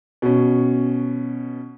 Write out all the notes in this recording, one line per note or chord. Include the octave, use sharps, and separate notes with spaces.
B2 C#4